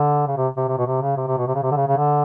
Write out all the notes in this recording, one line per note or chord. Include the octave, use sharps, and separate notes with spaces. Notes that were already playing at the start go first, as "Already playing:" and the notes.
Already playing: D3
C#3
C3
C3
C3
B2
C3
C#3
C3
C3
B2
C3
C#3
C3
D3
C#3
C#3
D3